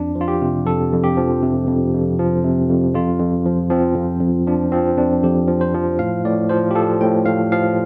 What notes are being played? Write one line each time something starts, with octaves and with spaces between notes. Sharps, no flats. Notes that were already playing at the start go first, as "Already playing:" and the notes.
Already playing: F2 D4
F3
F4
G4
C3
F2 A4
F2
G4
F3
C3
F2
F2
F3
C3
F2
F2 F4
F2
F3
F3 C4
F2
F2
F3 D4
F3 C4
F2 D4
F2 G4
F3
C5
F3
A2 F5
A2 D5
F3 C5
G4
F3 A4
A2 G5
A2 F5
F3 F5